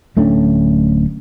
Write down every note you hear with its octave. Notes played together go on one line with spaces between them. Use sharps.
D1 A3 C#4 D4